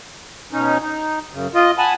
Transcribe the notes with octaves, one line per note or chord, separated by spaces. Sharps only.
B2 C#4 D#4
D#4
F#2 C#3
F4 D#5
F#5 G#5 A5 B5